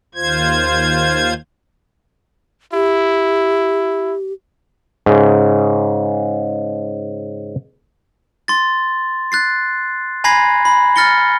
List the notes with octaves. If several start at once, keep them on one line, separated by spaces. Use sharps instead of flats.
D#2 F4 C5 G#6
E4 G4
G#2 C#3
C6 A6
F#6 A6 C7
G#5 A#5 B5 G#6 A#6 C7
B5
F6 A6 A#6 C#7 G7